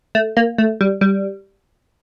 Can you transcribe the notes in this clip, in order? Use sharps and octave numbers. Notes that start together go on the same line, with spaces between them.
A3
A#3
A3
G3
G3